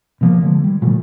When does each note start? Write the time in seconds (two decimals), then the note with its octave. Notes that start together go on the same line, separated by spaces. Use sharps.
0.21 B2 F3 A#3
0.43 D3 F3 G#3
0.64 G3
0.82 A#2 C#3 F3 A3